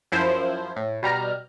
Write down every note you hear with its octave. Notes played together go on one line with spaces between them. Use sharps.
F#2 F3 E4 C5
A2
B2 G3 A#5 F6